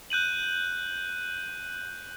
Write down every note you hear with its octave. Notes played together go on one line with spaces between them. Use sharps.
F#6 G6 D#7 F#7